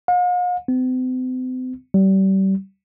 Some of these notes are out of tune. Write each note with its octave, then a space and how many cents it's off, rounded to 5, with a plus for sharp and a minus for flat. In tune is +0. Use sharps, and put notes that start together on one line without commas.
F5 +45
C4 -45
G3 -30